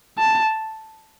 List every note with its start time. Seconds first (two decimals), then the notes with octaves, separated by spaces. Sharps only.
0.18 A5